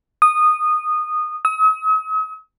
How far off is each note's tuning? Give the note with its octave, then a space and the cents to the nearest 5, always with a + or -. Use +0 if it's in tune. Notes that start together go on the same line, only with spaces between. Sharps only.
D#6 -15
D#6 +45